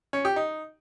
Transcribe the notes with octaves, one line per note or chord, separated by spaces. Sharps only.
C#4
G4
D#4